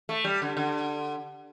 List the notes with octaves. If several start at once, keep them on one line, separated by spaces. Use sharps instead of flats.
A3
G3
D3
D3